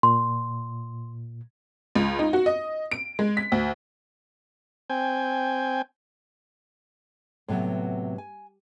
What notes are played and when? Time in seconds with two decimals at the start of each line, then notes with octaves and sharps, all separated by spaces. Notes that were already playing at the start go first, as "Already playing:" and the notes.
0.03 A#2 C6
1.95 C#2
2.19 D#4
2.33 F#4
2.46 D#5
2.91 D7
3.19 G#3
3.37 B6
3.52 D2
4.90 C4 G5 G#5
7.48 A2 C3 F#3 B3
8.18 G#5